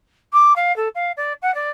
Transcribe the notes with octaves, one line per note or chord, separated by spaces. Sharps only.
D6
F5
A4
F5
D5
F#5
D5